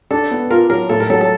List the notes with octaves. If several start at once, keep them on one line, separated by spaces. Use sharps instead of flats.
D4 A4
B3
F4 A#4
F#3 A#4
A2 A4
A#4
F#3 A4
A4